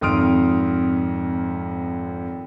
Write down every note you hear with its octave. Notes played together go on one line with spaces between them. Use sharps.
G#1 F2 C6 D#6 F6 D7